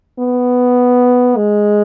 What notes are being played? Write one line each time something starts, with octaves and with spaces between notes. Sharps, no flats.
B3
G#3